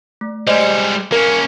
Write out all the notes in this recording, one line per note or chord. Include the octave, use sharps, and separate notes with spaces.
A3
G3 G#3 C5 D5 D#5
C#7
A#3 C#4 A#4